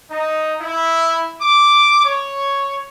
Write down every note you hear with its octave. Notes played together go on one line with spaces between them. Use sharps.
D#4
E4
D6
C#5